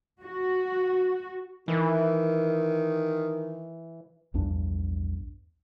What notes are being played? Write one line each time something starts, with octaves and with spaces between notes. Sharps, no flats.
F#4
D#3 E3
A#1 E2 G2 D4